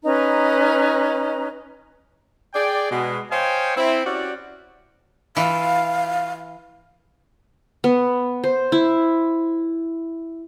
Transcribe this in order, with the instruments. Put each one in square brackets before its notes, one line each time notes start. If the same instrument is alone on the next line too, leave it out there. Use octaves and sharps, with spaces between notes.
[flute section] C#4 D#4 B4 A#5
[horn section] G#4 D5 G5
B2 G#3
C5 C#5 D#5 F5 G5 G#5
C4 E4
C#4 F#4 G4 D5
[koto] E3 [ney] F5
[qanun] B3
C5
E4